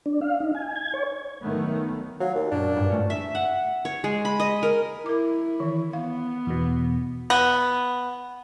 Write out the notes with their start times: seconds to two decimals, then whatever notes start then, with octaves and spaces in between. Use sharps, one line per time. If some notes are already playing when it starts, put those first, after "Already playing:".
0.06 D4
0.21 F5
0.40 D#4
0.55 G#5
0.76 G#6
0.94 C#5
1.41 D#3 F#3 A3 B3
2.20 F#3 F5
2.35 D#2
2.51 F#2 A#2 D4
2.77 G2
2.89 G#2 A3 C#4
3.10 E5
3.35 F#5
3.85 C#5
4.04 G#3
4.25 B5
4.40 D#5
4.63 A#4
5.06 E4 A#4 D6
5.60 D#3 E3
5.93 B3 F5
6.47 E2 B2
7.30 B3